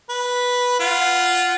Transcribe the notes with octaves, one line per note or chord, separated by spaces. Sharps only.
B4
F4 F#5